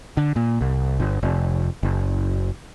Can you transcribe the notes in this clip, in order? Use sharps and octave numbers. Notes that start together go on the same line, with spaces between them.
D3
A#2
C2
G1
F1
F#1